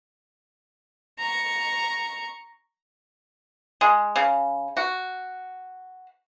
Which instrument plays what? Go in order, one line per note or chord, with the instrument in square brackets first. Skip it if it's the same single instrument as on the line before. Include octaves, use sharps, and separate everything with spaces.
[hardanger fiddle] A#5 C#6
[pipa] G#3
C#3
F#4